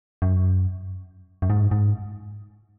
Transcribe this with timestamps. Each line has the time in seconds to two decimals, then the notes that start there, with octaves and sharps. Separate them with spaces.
0.22 F#2
1.42 F#2
1.50 G#2
1.71 G#2